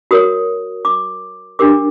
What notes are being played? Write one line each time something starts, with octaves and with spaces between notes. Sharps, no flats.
F#4 A#4 C#5 D#6
D6
D4 G4 A#4 D6